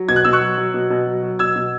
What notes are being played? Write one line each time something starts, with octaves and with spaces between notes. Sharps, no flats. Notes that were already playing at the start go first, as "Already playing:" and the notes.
Already playing: F#3
B2 G#6
F#6
B2 E6
C#6 F#6
F#3
F#3
B2
B2
F#3
F#3
B2 E6 G#6
B2